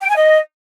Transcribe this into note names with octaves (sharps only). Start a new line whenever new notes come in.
G5
G#5
D#5